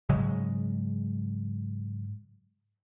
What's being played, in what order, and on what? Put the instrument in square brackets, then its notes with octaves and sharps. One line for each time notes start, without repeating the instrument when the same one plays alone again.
[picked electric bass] G#2 C#3 F#3 G#3